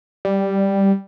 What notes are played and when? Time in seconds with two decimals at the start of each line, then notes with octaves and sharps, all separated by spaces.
0.25 G3